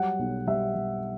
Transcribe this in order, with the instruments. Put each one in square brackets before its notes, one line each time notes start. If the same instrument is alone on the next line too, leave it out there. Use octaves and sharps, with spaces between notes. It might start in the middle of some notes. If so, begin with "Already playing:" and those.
Already playing: [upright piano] F#3 G3 F#5
B1
G3 E5
G3